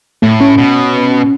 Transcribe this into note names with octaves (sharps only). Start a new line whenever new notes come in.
A2 A3
C#4
B2